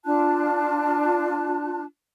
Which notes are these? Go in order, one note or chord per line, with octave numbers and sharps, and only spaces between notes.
D4 F4 A5 F#6